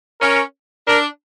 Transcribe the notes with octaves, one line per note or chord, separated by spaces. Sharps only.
C#4 A#4
D4 A#4